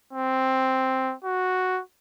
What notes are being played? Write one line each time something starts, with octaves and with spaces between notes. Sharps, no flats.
C4
F#4